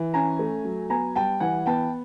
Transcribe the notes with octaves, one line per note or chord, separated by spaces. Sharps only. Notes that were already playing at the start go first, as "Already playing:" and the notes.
Already playing: E3
C#4 G#5 A#5
A3
F#3
B3 G#5 A#5
G3 G5 A5
E3 F#5 G#5
B3 G5 A5